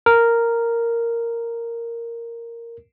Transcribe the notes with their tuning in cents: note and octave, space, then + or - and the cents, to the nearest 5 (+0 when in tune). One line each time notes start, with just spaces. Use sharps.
A#4 -5